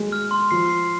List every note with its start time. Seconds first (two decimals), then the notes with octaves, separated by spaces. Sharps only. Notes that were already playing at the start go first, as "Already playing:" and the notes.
Already playing: G#3
0.12 F6
0.31 C6
0.51 F3 C7
0.70 C7